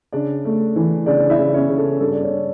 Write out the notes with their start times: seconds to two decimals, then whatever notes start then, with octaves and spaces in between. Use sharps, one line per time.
0.13 C#3 D4 D5
0.45 A3
0.76 E3
1.06 C#3 D4 D5
1.30 E4 E5
1.38 C#3
1.54 C#4 C#5
1.69 C#3
1.77 A4
2.00 G2 A4
2.12 D5
2.23 C#4 C#5